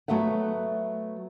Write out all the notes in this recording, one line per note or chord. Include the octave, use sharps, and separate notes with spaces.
F#3 A3 B3 E5 F#5